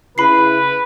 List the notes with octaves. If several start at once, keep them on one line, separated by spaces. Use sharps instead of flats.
C#3 E4 B4 B5 C7